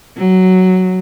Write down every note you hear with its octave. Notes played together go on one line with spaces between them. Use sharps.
F#3